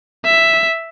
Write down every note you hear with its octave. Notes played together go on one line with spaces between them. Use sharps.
E5